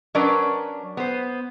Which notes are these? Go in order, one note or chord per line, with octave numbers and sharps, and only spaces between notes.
F#3 C#4 D4 A#4 B4 D5
B3 C5